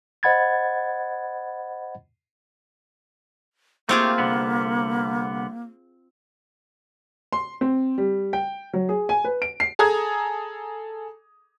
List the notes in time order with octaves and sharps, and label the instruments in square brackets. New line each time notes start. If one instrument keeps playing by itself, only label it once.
[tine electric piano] C5 D#5 F#5 B5 G#6 A6
[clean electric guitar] A3 G4 [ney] A#3 [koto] C4 F4 G#4
[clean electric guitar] C2 D3 B3
[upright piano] C6
C4
G3
G5
F#3
G#4
G#5
B4
D7
C7
[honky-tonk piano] G#4 A4 A#5 D#6 G#6